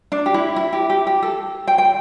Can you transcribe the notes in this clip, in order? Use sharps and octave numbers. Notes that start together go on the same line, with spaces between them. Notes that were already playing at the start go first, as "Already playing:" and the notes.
D4
G4
E4
E4
G4
G4
G4
A4
G5
G5